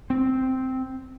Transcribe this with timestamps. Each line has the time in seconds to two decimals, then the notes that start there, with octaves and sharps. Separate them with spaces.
0.10 C4